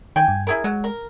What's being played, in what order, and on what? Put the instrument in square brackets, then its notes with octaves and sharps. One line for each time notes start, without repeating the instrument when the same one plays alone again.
[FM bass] D#3 [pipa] G5 G#5
[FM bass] G2
[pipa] E4 G#4 A#4
[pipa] F#3 [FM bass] G#3
[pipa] A#4